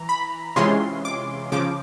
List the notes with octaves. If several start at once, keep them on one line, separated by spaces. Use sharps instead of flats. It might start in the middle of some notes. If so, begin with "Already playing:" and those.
Already playing: E3 A#5
B5
C3 E3 G#3 C#4 F4 C6
D6
C#3 F3 D6